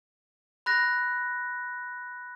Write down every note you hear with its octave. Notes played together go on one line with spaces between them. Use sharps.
B5 F#6 A#6